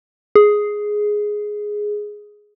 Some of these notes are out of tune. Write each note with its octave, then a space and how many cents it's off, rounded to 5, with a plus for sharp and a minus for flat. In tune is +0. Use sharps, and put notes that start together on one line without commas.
G#4 +5